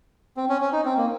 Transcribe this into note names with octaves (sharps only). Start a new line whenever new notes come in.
C4
C#4
C#4
D#4
C4
A#3